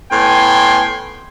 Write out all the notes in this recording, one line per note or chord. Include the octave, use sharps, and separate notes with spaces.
A2 B3 G5 G#5 C6